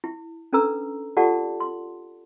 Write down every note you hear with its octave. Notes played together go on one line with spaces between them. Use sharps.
E4
C#4 D4 A4 B4 A#5 E6
F4 G4 A4 D5 F#5 A5
C6